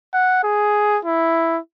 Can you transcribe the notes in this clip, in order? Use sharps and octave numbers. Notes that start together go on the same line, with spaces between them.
F#5
G#4
E4